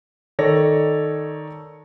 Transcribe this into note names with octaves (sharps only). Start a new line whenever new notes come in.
D#3 A4 C#5 D5 A#6